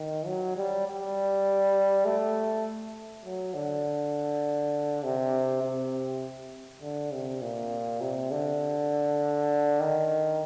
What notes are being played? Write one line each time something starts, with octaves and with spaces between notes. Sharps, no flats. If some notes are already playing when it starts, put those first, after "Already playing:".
Already playing: D#3
F#3
G3
G3
A3
F#3
D3
C3
C3
D3
C3
A#2
C3
D3
D#3